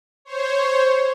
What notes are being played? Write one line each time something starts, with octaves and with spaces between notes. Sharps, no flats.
C5 C#5